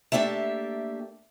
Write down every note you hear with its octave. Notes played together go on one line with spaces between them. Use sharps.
A3 A#3 D4 G4 E5